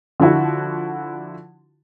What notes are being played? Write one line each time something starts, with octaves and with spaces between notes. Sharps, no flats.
D3 F3 E4 F#4